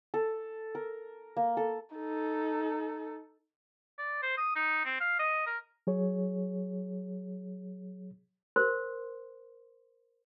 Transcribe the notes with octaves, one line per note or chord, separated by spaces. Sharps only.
A4
A#4
A#3
A4
D#4 A4
D5
C5
D#6
D#4
C4
F5
D#5
A#4
F#3 G#4 C#5
A#4 C5 C6